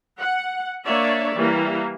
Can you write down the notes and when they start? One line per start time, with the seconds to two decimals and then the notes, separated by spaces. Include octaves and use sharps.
0.19 F#5
0.85 A#3 D4 C#5 D5 E5
1.35 E3 G3 A#3